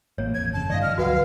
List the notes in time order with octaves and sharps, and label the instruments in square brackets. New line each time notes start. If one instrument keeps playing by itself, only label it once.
[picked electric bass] A1 A#3 [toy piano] C#5
[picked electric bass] A1 F2 [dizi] G#6
[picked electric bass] G1 C#3 [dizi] A5
[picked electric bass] G1 G2 D#3 [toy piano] D5 F5 [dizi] D#5
[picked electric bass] F3 [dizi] F6
[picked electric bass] C#2 D3 F#3 [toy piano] F#4 B4 F#5 [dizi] F5